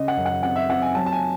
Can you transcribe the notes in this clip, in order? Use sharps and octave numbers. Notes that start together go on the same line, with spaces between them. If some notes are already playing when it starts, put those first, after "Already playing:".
Already playing: C#3 D#5
F#5
F#2
F#5
C4 F#5
E5
C4 F#5
G#5
F#3 A5
A5
G#5